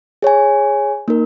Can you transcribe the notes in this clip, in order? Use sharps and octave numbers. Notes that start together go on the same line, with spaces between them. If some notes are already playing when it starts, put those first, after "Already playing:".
G#4 C#5 G#5
A#3 D#4 A#4